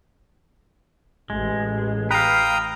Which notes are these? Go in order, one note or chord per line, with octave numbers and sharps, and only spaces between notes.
A1 G#3
B4 F5 G5 A#5 D#6